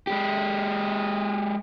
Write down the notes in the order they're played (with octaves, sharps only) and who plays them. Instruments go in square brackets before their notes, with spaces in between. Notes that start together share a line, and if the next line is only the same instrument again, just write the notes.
[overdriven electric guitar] G#3 G4